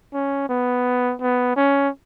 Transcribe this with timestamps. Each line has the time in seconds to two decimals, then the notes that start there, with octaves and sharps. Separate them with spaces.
0.13 C#4
0.49 B3
1.21 B3
1.56 C#4